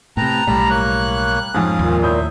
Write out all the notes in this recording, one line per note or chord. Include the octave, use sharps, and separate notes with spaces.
A2 C3 B4 G5 A5 A#5
B1 A2 G3 A5 B5
A#3 C#5 F#6
F2 G#2 C#4 F5 D#6
D#2 A#2
A2 F#3 E5 D#6 G6